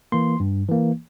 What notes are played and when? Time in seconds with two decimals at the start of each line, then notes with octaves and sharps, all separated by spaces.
0.12 E3 A#3 C6
0.40 G2
0.69 E3 A#3